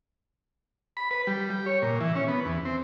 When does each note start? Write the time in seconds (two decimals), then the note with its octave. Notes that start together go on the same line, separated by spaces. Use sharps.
0.97 B5
1.11 B4
1.27 G3
1.50 G4
1.66 C#5
1.82 A#2
2.01 E3
2.15 C#4
2.28 B3
2.45 E2
2.65 C4